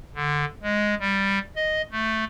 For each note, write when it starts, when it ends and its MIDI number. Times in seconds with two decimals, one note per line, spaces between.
0.15 0.45 50
0.62 0.95 56
1.00 1.39 55
1.56 1.82 75
1.92 2.24 57